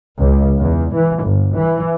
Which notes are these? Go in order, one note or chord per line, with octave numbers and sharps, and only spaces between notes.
C#2
E2
E3
G1
E3